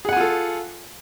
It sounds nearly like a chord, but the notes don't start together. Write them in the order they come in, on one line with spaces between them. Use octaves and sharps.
G#4 F#5 G#5 F4 A4